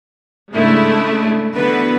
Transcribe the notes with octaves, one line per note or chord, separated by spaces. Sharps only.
G#2 C#3 G#3 A3 D4 E4
D3 E3 B3 F#4 B4